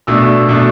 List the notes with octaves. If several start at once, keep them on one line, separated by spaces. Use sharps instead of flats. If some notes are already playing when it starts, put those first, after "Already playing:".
B2 A3 D4 E6
B2 A3 D4